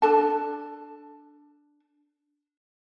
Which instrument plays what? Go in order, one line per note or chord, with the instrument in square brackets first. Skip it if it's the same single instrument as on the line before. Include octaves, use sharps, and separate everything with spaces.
[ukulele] D4 A4 A5